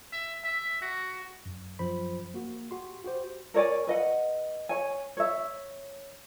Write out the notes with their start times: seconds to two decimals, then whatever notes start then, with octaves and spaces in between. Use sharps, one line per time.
0.12 E5
0.45 E5
0.82 F#4
1.46 F#2
1.79 F#2 F3 C5 B5
2.34 A#3 F#4
2.71 F#4 G4 C6
3.04 F#4 G4 C5
3.54 A#4 C#5 D5 G#5
3.87 B4 D#5 F#5
4.69 C#5 G#5
5.17 C#5 E5